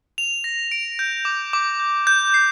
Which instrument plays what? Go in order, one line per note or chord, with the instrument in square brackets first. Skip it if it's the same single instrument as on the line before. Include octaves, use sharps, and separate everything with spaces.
[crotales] F7
A#6
D7
G6
D6
D6
G6
G6
C7